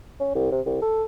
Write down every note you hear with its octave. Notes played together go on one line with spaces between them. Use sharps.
C#4
C2
C3
C2
A4